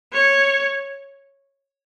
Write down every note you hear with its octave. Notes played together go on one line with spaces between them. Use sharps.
C#5